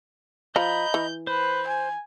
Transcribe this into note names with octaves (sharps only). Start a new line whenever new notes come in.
F3 D#5 A#5 B5 G6
E3
B4 C5
G#5